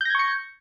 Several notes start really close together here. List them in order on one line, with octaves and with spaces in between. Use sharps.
G6 A#6 G#6 C#6 C#7